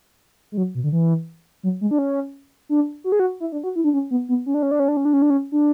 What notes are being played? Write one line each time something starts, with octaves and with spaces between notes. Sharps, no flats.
G#3
F#3
B2
D3
E3
F#3
G#3
D4
C#4
D4
F#4
G#4
F#4
E4
D4
F#4
E4
D4
C#4
B3
B3
C#4
D4
C#4
D4
C#4
D4
C#4
D4
C#4
D4
C#4
D4